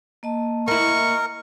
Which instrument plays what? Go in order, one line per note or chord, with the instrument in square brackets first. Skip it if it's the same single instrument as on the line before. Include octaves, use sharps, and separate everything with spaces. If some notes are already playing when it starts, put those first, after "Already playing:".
[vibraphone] A#3 D#5 A5
[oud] A#3 E4 [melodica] A#4 [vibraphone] D#5 [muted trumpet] C#6